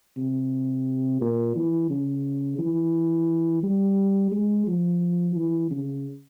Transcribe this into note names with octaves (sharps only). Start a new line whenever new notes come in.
C3
A#2
E3
C#3
E3
G3
G#3
F3
E3
C#3